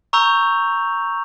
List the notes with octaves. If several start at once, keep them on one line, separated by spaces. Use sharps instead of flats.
A#5 C#6 E6 G6 F7